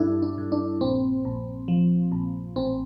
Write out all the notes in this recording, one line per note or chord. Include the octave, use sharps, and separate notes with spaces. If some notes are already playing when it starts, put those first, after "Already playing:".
Already playing: G2 G3 D4 E4 A4
D4
G2
D4
A#1 C4
A#1
F3
A#1
A1 C4